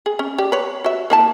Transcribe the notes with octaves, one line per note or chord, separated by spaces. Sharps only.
G#4
C#4
G4 D5
B4 C#5
F#4 E5
A#3 E4 A5